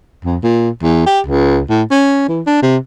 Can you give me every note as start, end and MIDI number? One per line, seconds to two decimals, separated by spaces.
0.25 0.37 41
0.43 0.70 46
0.83 1.04 40
1.06 1.20 67
1.27 1.62 37
1.69 1.83 45
1.91 2.26 61
2.28 2.42 52
2.47 2.58 62
2.62 2.77 48